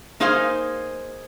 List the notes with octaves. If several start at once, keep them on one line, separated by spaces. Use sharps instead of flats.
A#3 D#4 G#4 C5 F5